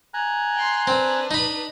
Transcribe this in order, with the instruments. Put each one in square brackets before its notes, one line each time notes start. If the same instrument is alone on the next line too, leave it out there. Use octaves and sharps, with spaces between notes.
[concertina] G#5 A#5 F#6
[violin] G5 C6
[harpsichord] C4 [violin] D4 B4
[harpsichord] D#4 B5